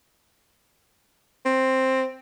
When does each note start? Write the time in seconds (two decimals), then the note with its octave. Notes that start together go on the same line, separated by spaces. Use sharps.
1.45 C4